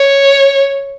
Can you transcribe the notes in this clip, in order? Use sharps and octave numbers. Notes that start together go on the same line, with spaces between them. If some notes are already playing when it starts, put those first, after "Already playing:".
Already playing: C#5